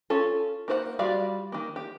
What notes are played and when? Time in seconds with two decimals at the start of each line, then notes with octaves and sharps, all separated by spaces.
0.10 C#4 F4 A4
0.68 A#3 D#4 C5 C#5 F#5
0.99 G3 F4 F#4 D5 F5
1.52 D#3 A#3
1.76 G4